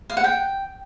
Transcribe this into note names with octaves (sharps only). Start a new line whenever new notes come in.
F5
F#5
G5